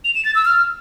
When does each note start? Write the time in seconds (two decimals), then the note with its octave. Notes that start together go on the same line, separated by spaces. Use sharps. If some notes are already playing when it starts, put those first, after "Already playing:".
0.04 F7
0.15 E7
0.25 A6
0.35 E6
0.45 F6